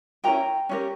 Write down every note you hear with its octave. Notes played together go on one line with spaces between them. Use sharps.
C#4 E4 G4 A#4 G5 A#5
C#4 E4 G4 A#4